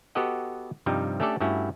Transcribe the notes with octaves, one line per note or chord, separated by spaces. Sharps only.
B3 F#4 G4 A4 D#5 F#5
G2 C3 F3 G3 D#4
A3 C#4 D4 G4 A4 D5
G2 A3 C#4 E4 F#4